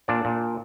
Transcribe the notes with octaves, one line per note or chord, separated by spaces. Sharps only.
A#2 D4 D5
A#2